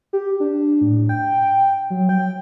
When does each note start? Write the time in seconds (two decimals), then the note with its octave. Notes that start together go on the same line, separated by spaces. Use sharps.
0.13 G4
0.40 D4
0.81 A2
1.09 G5
1.90 F#3
2.09 G5